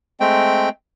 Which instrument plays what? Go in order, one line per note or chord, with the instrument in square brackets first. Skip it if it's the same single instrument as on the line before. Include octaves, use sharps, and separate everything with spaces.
[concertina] G#3 A3 C4 G5